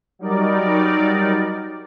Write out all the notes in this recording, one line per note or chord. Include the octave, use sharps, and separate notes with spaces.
F#3 G3 D#4 A#4 D5